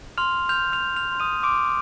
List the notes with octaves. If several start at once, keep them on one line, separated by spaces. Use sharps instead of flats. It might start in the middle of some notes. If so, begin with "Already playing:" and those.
C6 F6 F7
F6 G6 F7
F6 F7
G6
F6 F7
C6
D#6 D#7
C6 D6 D7